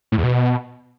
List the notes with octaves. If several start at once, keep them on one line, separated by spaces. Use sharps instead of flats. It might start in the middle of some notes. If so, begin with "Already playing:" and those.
A2
E2
B2